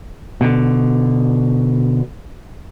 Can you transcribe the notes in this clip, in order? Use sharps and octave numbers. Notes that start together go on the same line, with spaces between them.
B2 D3